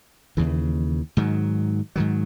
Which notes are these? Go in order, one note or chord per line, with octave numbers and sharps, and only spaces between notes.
D#2 C#3 E3
G#2 D#3 F#3
G#2 D#3 F#3